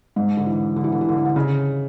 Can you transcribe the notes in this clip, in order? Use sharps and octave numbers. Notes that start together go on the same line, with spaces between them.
G#2
D3
E3
D3
E3
D3
E3
D3
E3
D3
C#3